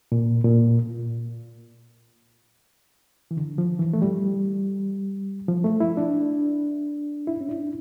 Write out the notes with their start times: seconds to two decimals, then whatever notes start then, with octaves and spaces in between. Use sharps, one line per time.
0.12 A#2
0.44 A#2
3.31 E3
3.37 D3
3.58 F3
3.79 E3
3.93 A3
4.02 G3
5.48 F3
5.64 A3
5.80 E4
5.97 D4
7.27 E4
7.41 C#4
7.49 D4